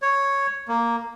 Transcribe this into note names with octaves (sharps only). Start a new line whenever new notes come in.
C#5
A#3